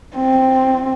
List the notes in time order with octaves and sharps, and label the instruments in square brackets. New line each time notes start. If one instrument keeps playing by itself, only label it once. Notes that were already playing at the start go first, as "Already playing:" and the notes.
[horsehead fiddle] C4